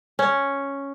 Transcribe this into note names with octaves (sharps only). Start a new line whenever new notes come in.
C#4